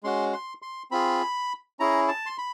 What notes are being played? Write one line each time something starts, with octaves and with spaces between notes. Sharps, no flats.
G#3 C#4 F#4 C6
C6
C6
C4 F4 G#4 B5
C#4 E4 G#4 A#5
A5
C6
B5